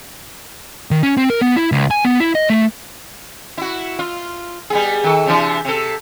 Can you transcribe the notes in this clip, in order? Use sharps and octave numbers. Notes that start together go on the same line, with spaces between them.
D#3
C#4
C4
A#4
B3
E4
C#2
G#5
B3
E4
D#5
A3
E4 F#4
F4
G3 B3 G#4
D#3 A4
C3 E3 D4
C3 A4